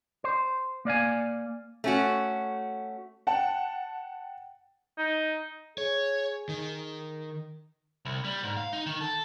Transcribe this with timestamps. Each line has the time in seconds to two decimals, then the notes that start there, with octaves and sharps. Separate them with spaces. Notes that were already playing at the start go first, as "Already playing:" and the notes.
0.24 C5
0.85 A#3 D5 F5 G#5
1.84 A3 C#4 F#4
3.27 F#5 G5 A5
4.98 D#4
5.78 G#4 C#5
6.49 D#3
8.05 C2
8.24 G3
8.43 G#2
8.57 F5
8.73 D#4
8.86 D#3
9.01 A4